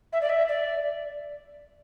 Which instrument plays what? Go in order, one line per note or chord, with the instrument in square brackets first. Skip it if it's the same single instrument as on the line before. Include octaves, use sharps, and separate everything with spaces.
[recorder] E5
D5
E5
D5